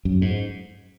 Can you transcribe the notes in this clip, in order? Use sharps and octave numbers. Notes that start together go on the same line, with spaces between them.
F#2
G#2